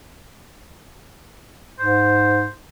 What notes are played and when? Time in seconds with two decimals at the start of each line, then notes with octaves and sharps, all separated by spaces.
1.79 G#2 C5